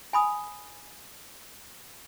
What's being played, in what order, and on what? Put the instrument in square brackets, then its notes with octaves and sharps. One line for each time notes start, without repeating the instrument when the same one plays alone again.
[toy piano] G#5 B5 D#6